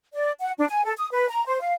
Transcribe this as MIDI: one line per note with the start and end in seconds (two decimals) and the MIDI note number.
0.13 0.31 74
0.40 0.51 78
0.57 0.66 62
0.69 0.84 80
0.84 0.93 69
0.96 1.08 87
1.12 1.27 71
1.29 1.43 82
1.46 1.61 72
1.61 1.73 77